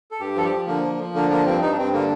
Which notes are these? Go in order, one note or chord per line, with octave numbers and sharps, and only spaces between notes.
A4
G2 G4
F3 A4
G4
F3
D3 A#3
F3
F3
D3 A#3
F3 A#3
G2 C4
G2 D#4
D4
G2 C4
D3 A#3